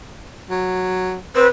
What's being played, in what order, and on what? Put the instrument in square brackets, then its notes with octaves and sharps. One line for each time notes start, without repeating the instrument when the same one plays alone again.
[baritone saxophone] F#3
[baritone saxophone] C4 [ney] B4